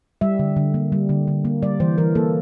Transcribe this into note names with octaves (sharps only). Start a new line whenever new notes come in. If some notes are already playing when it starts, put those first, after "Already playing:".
G3 E5
D3
D3
A#3
G3
D3
D3
A#3
G3 D5
E3 C5
E3 A#4
A#3 A4